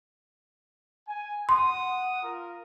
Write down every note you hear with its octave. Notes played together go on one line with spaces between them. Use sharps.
G#5
F#5 C6 D#6
F4 A#4